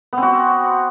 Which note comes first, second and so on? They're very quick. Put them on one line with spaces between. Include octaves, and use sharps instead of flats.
B3 C4 F#4